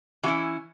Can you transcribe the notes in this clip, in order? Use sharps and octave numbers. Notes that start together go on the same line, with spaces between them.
E3 C#4 E4 F#4